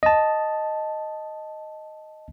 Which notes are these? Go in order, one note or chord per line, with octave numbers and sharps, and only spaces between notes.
D#5 A5